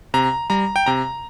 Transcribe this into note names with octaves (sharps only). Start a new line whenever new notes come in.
C3 A#5
G3 A#5
G5
C3 A#5